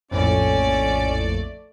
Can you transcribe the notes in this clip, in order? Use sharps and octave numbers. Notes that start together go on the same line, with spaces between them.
A#1 F2 A2 A3 C#4 D5